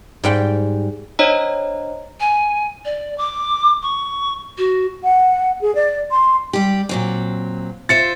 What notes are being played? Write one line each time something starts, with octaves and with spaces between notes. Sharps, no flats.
G#2 G3 G5
D4 C5 C#5 D#5 A#5
G#5
D5
D6
C#6
F#4
F#5
G#4
D5
C6
G3 G4
A#2 F#3 C4
F4 C5 E5 A6 C#7